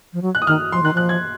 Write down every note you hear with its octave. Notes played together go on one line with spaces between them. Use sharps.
F3
F#3
F#6
D#6
D#3 F6
F3 C6
D#3 F#6
F3 F#6
G#6